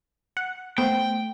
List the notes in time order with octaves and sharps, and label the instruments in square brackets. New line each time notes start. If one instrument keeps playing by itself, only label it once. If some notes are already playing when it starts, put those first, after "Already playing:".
[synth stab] F#5
[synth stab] A3 B3 C5 [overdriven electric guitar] G5